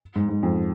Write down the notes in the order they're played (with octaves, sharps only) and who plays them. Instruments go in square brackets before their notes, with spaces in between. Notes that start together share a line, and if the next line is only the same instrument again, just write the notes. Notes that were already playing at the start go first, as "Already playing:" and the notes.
[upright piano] G#2
G#2
F2